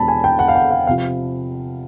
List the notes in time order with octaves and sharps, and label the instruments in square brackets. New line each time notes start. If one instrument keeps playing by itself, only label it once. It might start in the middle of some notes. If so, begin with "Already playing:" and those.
Already playing: [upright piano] E2 B2 G#3 A5 B5
G#5
G5
F#5
F5
F#5
F5
C3 F3 F5